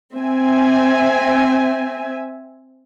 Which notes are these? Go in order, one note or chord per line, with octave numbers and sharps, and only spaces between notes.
C4 E5 G#5